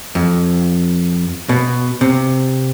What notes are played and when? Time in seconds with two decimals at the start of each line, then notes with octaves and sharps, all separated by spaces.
0.15 F2
1.49 B2
2.01 C3